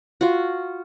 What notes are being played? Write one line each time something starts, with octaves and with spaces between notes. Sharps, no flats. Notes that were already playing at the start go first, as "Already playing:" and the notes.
F4 F#4